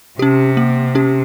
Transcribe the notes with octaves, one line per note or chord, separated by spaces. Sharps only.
C3 C#4 G4
A#3
C#4 G4